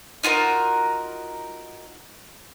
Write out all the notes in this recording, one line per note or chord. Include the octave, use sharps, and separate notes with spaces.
D#4 F4 F#4 A#4